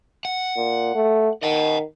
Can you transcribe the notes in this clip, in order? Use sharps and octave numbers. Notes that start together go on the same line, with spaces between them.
F#5
A#2
A3
D#3 D#5 F#5